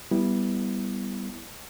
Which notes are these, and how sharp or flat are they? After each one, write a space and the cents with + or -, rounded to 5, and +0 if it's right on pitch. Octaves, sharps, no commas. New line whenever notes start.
G3 +0 B3 +0 E4 +0